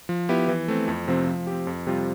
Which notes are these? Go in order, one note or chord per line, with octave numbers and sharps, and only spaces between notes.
F3
B3 E4 G4
E3
A3 C4
F2
C3 F3 C4
F3
C4 G4
F2
C3 G3 C4 F4